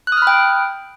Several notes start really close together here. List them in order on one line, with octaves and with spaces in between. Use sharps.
F#6 D#6 F6 B5 G5